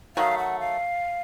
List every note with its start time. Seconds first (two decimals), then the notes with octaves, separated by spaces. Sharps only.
0.16 D#3 F#3 A3 F5
0.38 F#5
0.60 F5